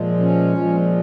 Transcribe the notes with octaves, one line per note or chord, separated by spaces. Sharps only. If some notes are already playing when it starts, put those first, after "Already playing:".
Already playing: A#2 F3 G#3
C#4
A#2 F3 G#3